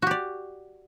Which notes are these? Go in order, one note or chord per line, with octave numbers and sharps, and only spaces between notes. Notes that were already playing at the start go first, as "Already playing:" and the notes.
F#4 G4 D5